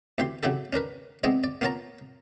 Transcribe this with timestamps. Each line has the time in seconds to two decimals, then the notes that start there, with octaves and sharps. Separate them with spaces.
0.18 D2 E3 G4 C6
0.43 C#3 F#3 E4 G4 A4
0.73 C#4 D4 A#4 B4
1.24 G#3 B3 C4 E4 D5 D#5
1.44 D5
1.61 A#3 B3 F4 C#5 A5 A#5